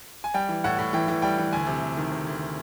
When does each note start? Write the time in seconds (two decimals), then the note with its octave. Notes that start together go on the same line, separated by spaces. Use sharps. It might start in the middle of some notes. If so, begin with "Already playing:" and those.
0.24 G#5
0.34 G3 G5
0.49 E3
0.64 A2 F#5
0.78 A2
0.93 E3 G5
1.08 E3
1.22 G3 G5
1.38 E3
1.52 D2 G#5
1.67 C3
1.82 D2
1.97 D#3
2.11 C3
2.27 D2